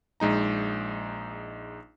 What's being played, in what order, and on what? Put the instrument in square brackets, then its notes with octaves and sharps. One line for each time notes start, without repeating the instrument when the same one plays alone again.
[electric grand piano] A#1 G#3 D#4 A#5